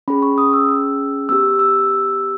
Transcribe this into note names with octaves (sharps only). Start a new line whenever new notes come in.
C#4 G#4 B5
C#6
D#6
E6
E6
B3 G4 E6
E6